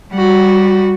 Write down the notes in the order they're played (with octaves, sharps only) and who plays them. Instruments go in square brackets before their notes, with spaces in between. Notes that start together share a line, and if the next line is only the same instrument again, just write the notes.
[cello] G3 F#4